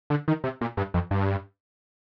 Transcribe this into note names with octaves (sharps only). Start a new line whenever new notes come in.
D3
D#3
C3
A#2
G2
F2
G2